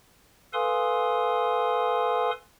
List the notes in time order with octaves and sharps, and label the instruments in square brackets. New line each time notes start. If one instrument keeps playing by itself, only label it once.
[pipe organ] A4 B4 F5 G#5 C6 D#6